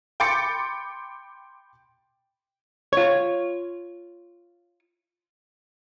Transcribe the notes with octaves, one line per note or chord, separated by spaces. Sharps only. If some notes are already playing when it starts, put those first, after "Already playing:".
G5 B5 C6 D6 A6 C#7
F4 C#5